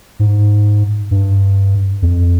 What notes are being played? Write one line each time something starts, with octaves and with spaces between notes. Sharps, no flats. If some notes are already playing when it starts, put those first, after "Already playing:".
G#2
G2
F2